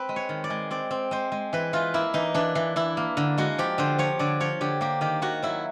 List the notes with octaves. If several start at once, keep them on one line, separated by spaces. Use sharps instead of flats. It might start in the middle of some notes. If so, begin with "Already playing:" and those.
Already playing: C4 B4
G#3
C#5
D#3
D5
G#3
C4 D5
C4
G#3 C5
G#3
E3 B4
E3 F4
A#3 E4
E3 D#4
E3 D4
E3
E3 E4
A#3
D3
G#3 F#4
F3 G4
D3 C5
F3 C#5
D3 D5
F3 C#5
D3 G4
A#3 G4
D#3 G4
D#3 F#4
F#3 E4